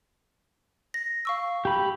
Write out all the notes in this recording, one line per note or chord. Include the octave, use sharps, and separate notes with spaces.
A#6
F5 C#6 E6
G4 B5